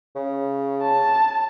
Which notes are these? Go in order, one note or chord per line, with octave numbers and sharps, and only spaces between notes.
C#3
A5